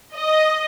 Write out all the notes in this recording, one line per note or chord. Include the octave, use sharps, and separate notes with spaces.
D#5